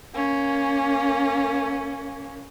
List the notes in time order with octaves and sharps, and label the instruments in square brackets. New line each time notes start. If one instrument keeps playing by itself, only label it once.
[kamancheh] A#3 C#4